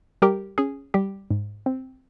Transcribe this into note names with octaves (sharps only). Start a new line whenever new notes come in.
G3 G4 A#4
C#4 G#4
G3 G4
G#2
C4